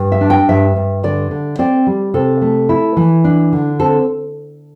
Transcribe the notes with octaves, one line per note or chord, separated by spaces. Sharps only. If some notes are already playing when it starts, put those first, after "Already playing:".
Already playing: G2
E5
D4
G5
G2 E5
G2
D3 D5
D3
C4 D5
G3
C3 A4
A3
E4
E3
D4
D3
C4 A4